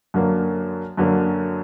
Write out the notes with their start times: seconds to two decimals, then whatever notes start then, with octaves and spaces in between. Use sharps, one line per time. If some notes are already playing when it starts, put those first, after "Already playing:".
0.14 F#2 D3 F#3 A#3
0.97 F#2 D3 F#3 A#3